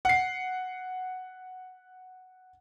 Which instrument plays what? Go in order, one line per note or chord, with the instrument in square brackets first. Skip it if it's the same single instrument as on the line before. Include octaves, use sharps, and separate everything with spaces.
[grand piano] F#5 C7